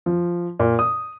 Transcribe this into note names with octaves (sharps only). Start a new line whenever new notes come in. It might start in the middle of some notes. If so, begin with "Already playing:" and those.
F3
A#2
D#6